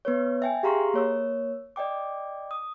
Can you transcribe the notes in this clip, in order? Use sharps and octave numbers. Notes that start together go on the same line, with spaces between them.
B3 B4 C#5
E5 G5 G#5
G4 G#4 F5 A#5 C6 C#6
A#3 C#5 E6
D5 D#5 G5 D6
D#6